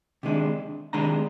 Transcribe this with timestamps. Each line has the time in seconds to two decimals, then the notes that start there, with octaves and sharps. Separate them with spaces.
0.23 C3 D#3 G#3 D4
0.93 C3 D#3 G#3 D4 A#5